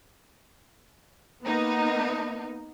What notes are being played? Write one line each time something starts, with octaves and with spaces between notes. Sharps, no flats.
A#3 B3 D#4